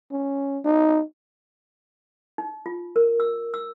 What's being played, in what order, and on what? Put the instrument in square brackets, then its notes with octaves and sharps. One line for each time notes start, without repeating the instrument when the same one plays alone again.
[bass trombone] C#4
D#4
[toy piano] D#4
F4
A#4
E6
E6